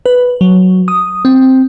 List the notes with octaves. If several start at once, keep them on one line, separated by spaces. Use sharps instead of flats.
B4
F#3
D#6
C4